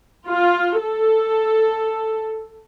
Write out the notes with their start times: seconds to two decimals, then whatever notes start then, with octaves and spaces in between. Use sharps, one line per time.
0.27 F4
0.81 A4